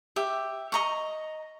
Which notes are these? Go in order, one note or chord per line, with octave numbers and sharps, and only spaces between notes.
G4 E5
D#5 A#5 C#6